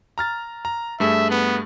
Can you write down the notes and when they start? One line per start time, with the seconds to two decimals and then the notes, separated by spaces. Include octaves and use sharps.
0.18 A#5 F6 A6
0.65 A#5
1.00 G2 A3 G#4 E5
1.30 B3